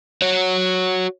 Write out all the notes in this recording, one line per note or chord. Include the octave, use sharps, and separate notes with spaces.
F#4 C#5